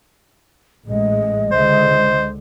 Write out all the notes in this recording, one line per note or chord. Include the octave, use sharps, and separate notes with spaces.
A1 G#3 D#5
C#2 D3 G#3 C5